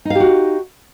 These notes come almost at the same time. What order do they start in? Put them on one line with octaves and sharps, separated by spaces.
D#4 F5 G4 F#4